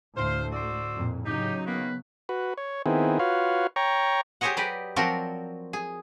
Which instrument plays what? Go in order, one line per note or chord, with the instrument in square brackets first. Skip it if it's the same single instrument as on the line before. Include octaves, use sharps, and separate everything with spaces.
[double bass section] D2 A3 [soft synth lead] A2 [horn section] C5 [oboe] F5
[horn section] F#4 C5 D5 [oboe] E6
[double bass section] F2 A#2
[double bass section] C#3 F#3 [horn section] D#4 [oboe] G4
[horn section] D#3 A#3 [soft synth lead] B3 [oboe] B4
[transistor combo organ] F#4 B4
C#5
D#3 B3 C4 E4 G#4
F4 F#4 B4 C#5 F5
C#5 G5 A#5 C#6
[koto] G4 G#4 C5 C#5 D#5 F#5
F#3 G4 B4 D5 D#5
F3 F#3 C4 F#4 A#4 D5
G#4